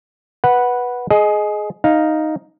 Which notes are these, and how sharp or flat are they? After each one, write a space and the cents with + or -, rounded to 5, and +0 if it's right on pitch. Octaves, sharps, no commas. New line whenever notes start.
B4 -10 F#5 +0
G#4 +20 D#5 +0
D#4 +0 F5 +0